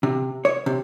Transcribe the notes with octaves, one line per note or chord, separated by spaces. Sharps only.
C3
C#5
C3